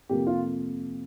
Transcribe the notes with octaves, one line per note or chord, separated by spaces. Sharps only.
F2 C3 F3 A#3 G4
F4